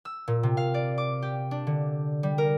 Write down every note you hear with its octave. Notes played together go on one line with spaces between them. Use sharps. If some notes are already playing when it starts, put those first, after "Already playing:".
E6
A#2
C3
F5
D5
D6
G4
D4
D3
G3
A#4